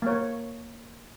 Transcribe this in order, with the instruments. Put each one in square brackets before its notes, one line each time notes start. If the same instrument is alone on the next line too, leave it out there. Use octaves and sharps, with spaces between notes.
[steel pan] A#3 C#5